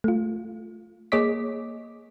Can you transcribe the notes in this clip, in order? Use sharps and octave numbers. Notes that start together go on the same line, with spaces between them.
A3 F4
A#3 G#4 C#5 D#5 D6 B6